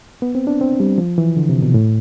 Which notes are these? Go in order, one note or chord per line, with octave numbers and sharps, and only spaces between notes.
B3
C4
D4
C4
G3
F3
E3
D3
C3
B2
A2